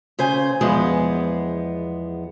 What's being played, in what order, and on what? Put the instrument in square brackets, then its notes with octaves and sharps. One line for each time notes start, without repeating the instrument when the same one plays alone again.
[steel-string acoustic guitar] C#3 C5 G#5
E2 F3 G#3 B3